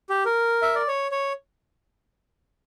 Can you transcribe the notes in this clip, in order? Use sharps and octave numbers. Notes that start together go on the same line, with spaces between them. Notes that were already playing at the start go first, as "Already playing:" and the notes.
G4
A#4
E5
D5
C#5
C#5